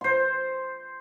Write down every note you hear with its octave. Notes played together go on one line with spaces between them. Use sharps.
C5 C6